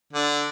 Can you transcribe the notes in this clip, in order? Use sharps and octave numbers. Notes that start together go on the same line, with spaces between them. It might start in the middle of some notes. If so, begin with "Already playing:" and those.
D3